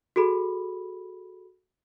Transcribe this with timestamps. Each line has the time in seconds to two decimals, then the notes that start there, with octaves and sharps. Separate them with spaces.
0.16 F#4 G#4 A4 B5